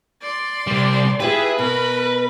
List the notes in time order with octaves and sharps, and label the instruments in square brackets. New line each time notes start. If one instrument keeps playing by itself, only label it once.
[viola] D5 C6
[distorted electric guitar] C3 G3
[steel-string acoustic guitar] E4 F4 G4 [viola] G#4 E5 [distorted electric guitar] B4
[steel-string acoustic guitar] B2 [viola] A#4 B5